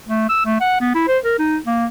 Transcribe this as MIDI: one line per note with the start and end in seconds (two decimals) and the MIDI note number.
0.08 0.27 57
0.29 0.45 88
0.45 0.56 57
0.60 0.79 78
0.80 0.92 59
0.94 1.05 64
1.07 1.18 72
1.23 1.36 70
1.38 1.57 63
1.66 1.85 58